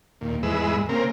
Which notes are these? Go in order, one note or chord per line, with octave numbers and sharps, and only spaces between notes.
D#2 A#2
E2 G#2 G#3 B4 E6
C#3 A#3 C4 A#4